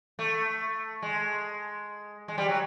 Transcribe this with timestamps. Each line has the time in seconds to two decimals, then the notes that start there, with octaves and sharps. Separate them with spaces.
0.19 A3
1.02 G#3
2.28 G#3
2.38 G3
2.49 F#3